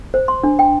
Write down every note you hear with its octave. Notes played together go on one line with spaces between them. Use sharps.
C5
C6
D4
G5